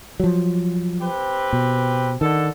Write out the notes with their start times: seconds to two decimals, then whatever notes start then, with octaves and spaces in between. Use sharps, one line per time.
0.20 F3 F#3
1.01 C4 G4 B4
1.53 B2
2.21 D3 D#3 A4